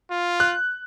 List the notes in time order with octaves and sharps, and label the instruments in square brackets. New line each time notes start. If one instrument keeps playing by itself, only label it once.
[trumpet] F4
[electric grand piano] F#6